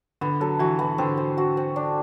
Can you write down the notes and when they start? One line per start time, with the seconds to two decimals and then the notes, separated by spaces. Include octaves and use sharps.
0.21 D3 B3
0.40 F#3 A4
0.59 E3 F#4
0.79 E3 B3
0.98 D3 C4
1.17 C5
1.37 F#4
1.57 C4
1.76 D4